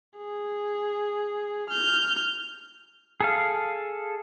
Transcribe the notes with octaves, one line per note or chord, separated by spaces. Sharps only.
G#4
F6 G6
G#4 A4 F5